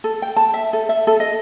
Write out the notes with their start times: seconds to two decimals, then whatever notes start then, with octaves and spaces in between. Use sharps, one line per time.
0.04 A4
0.22 G5
0.36 A5
0.54 E5
0.73 A4
0.89 E5
1.07 A4
1.20 D#5